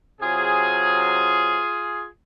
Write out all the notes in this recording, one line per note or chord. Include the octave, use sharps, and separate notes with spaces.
C3 F#3 F4 G#4